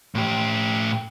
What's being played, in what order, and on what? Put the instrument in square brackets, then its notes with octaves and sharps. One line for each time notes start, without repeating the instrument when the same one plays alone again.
[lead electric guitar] A2 G4